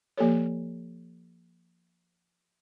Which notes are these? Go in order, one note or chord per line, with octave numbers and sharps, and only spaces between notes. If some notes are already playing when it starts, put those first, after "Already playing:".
F3 A#3 G4 A4 C#5